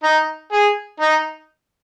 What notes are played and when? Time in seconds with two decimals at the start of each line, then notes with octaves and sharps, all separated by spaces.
0.03 D#4
0.52 G#4
1.00 D#4